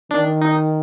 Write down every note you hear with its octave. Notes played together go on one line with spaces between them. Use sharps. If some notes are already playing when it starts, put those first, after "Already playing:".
D#3 D4
D#4